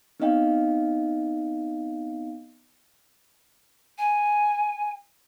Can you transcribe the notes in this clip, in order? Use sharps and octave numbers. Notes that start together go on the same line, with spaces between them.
B3 C4 D#4 D#5 F5 G5
G#5